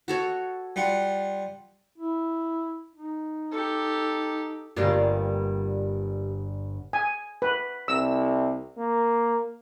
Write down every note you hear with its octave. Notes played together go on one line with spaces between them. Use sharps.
F#4 A4 C#5
G3 F4 F#5
E4
D#4
G4 A4
G1 G2 G3 A#3 F4
G#5
B4
C2 E6
A#3